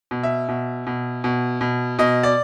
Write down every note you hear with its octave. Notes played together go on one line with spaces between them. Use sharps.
B2
E5
B2
B2
B2
B2
B2 D#5
D5